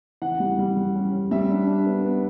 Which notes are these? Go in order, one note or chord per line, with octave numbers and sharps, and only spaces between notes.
E3 F#5
G3
G3
G3
C#4
C#4
G3 E5
D4
D4
B3
B3